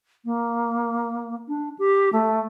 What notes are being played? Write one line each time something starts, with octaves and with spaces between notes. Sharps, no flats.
A#3
D4
G4
A3